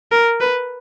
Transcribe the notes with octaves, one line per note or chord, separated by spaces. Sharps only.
A#4
B4